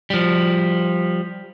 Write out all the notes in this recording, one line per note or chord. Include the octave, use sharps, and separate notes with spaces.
F3 G3